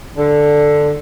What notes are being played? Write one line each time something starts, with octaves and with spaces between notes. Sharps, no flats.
D3